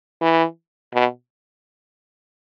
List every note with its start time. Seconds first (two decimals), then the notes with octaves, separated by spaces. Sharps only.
0.21 E3
0.94 B2